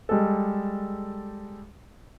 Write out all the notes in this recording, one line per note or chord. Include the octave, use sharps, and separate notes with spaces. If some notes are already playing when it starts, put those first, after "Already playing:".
G3 G#3 G4 A4